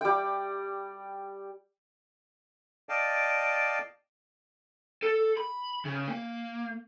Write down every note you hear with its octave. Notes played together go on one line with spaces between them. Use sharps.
G3 G5
D5 D#5 F5 G5 A5
A4
B5
C#3
A#3